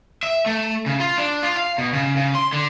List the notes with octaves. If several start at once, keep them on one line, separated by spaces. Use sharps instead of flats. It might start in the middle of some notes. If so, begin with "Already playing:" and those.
E5
A3
C#3
F4
D4
F4
F5
B2
C#3
C#3
C6
D3